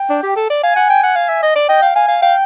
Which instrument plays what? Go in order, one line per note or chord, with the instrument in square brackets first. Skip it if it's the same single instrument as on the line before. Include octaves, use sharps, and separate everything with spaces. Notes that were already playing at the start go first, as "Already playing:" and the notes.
Already playing: [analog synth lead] G5
[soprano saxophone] D4
G4
A4
D5
[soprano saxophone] F5 [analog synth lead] G#5
[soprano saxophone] F#5
G5
F#5
F5
E5
D#5
D5
[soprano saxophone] D#5 [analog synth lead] G5
[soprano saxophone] F5
[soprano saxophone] F5 [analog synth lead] G#5
[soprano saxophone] F5
[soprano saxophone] F5 [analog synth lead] G5